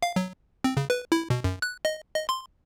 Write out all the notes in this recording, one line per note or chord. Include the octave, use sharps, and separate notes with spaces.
F5
F#3
C4
C#3
B4
E4
B2
F#2
F#6
D#5
D#5
C6